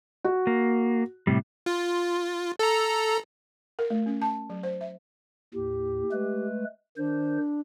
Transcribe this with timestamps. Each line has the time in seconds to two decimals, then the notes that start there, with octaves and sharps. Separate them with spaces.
0.25 F#4
0.47 A#3
1.27 A2 C3 G3
1.66 F4
2.59 A4 A#5
3.79 A#4
3.90 A3
4.06 C#4
4.22 A5
4.50 F#3
4.63 C5
4.81 E5
5.54 D#2 A2 G4
6.12 G#3 A3 B4
6.97 D#3 D4 C5